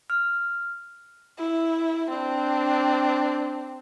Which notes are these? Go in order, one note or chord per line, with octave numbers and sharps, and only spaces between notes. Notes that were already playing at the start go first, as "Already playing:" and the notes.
F6
E4
C4 D4